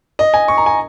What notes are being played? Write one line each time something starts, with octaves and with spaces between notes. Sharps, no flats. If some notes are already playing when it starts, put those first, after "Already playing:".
D#5
G#5
C#6
A#5
G#5